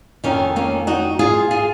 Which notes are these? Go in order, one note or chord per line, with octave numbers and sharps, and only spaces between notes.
F2 D#3 A#3 C#4
A#3 C#4
D#4 F#4
F4 G#4
F4 G#4